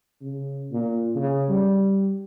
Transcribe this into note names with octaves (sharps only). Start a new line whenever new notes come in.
C#3
A#2
C#3
G3